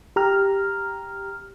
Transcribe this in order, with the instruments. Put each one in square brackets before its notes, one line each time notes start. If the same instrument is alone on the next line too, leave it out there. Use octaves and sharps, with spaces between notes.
[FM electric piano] G4 A#5 F6